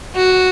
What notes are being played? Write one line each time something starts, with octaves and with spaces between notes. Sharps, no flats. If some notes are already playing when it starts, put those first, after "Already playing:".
F#4